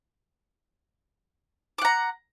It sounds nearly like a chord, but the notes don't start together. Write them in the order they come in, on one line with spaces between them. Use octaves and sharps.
D6 F#5 A#5